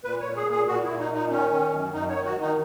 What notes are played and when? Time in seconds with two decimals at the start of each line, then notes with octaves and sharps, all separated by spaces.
0.04 A#2 B4
0.21 A#2 C#5
0.36 G#4
0.46 A#2 G#4
0.68 A#2 F#4
0.84 A#2 E4
0.99 D#4
1.09 A#2
1.14 D#4
1.31 D#3 C#4
1.52 D#3
1.72 F#2
1.93 F#2 D#4
2.09 C#5
2.15 D#3
2.25 F#4
2.36 D#3
2.42 D#4